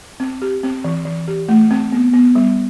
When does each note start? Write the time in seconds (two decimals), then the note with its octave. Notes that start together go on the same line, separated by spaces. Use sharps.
0.20 C4
0.42 G4
0.63 C4
0.84 E3
1.05 E3
1.28 G4
1.49 A3
1.71 C4
1.92 B3
2.14 B3
2.35 G3